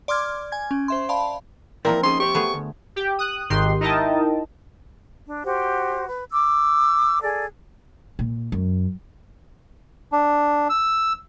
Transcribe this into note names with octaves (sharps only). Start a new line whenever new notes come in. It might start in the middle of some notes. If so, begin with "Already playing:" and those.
D5 C6 D6 F6 G#6
G#5 G#6
C#4
C5 E5 C6
D5 F5 A5 B5
F3 A#3 C4 E4 A#4 D5
C#4 D#4 G#4 C6
G4 C5 C#6
A3 B3 G#4
D2
G4 G5
D#6 F#6
G#1 G#2 D#3 G4 C6
D#4 E4 A#4 D#5 G5 A5
D4
F#4 G4 C5
B4
D6 E6
G#4 A4 D5
A#2
F#2
D4
E6